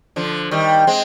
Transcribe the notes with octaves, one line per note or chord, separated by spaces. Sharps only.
D3 F3
D#3 G3
G#3 C4